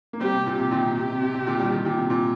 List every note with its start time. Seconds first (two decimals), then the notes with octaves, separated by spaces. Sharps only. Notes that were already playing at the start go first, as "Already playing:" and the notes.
0.13 A#3
0.21 G3 C4 G4
0.33 C3
0.46 A#2
0.58 C3 G4
0.71 A#2 D#3
0.84 C3
0.96 C3
1.09 C3
1.22 C3
1.34 C3
1.46 A#2 D#3
1.60 D#3 G3
1.72 D#3 G3
1.85 A#2 D#3
1.98 C3
2.10 A#2